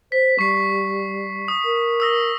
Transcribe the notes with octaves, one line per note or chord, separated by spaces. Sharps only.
C5 B6
G3 C#6 C7
D#6
A#4
D#6 E6 A#6